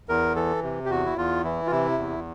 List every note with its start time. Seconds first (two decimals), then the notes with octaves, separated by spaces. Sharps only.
0.09 E2 A#4
0.36 E3 A4
0.63 C3
0.86 G4
0.89 E2 F#4
1.05 E4
1.17 E2 F4
1.44 E3 E4
1.67 F4
1.71 C3 E4
1.98 E2